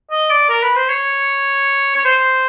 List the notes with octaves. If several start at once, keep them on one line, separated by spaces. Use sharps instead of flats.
D#5
D5
A#4
B4
C5
C#5
C#5
C5